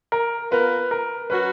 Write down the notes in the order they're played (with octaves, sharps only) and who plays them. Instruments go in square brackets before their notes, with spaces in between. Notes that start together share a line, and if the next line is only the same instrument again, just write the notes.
[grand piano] A#4
[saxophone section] B3 F4 A#4 [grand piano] B4
[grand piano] A#4
[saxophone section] F#3 C#4 F#4 [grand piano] B4